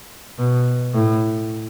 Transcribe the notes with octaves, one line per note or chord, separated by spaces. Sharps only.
B2
A2